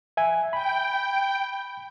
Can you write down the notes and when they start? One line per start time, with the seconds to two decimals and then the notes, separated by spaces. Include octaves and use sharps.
0.17 E5 G#5
0.53 G5 B5